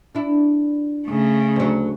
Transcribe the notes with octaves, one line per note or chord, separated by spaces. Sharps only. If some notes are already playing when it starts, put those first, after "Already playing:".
D4 E4
C#3 A3
D2 F#3